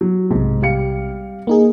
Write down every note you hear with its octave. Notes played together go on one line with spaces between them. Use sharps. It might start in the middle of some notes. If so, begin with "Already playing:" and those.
F#3
B1 G#2 C3
G3 F5 C#7
A#3 D#4 G#4